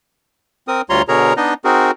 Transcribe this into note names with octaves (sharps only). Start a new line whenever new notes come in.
C4 A#4 D#6
D2 G3 F4 C#5 A#5 C6
B2 D3 G#4 A#4 C#5 A#5
B3 D4 D#4 D#5
C4 D#4 F#4 G#4 A#4